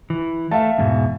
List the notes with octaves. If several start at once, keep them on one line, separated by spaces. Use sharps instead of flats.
E3
A3 E5 F5 A5
E2 G#2 B2